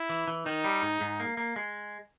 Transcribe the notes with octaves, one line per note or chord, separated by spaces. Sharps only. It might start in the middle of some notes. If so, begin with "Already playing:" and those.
Already playing: E4
E3
E3
D#3 D#4
G3
G#2
G#2
A#3
A#3
G#3